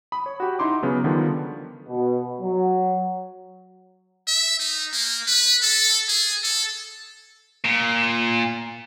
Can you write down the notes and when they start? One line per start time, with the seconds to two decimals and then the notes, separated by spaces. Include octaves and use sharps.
0.12 B5 D#6
0.26 C#5
0.40 F#4 G4
0.59 D#4 E4 C6 D6
0.83 C#3 F#3 B3
1.04 D3 D#3 F3 G3 B3
1.87 B2
2.40 F#3
4.27 E5
4.60 D#4
4.93 A#3
5.28 B4
5.62 A4
6.09 G#4
6.44 A4
7.64 A#2